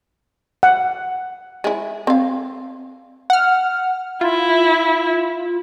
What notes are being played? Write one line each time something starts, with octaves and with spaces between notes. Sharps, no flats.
F#5
G#3 E4
C4 F5
F#5 F6
E4 F4